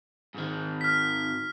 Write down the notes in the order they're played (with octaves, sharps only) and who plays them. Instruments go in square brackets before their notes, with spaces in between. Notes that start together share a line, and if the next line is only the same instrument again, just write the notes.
[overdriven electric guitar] G#2 D#3
[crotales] F6 B6